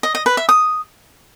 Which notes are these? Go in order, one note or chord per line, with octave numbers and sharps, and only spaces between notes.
D#5
D#5
B4
E5
D#6